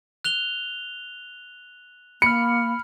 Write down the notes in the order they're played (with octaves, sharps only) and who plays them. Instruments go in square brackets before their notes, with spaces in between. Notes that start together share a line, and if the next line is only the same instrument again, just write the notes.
[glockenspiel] F#6 F7 G7
[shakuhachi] A#3 [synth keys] B5 F6 [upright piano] C#7